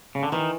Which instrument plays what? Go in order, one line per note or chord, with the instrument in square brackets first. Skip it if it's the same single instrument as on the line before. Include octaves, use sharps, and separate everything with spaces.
[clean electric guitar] C#3
D3
[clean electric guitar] D#3 [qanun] E3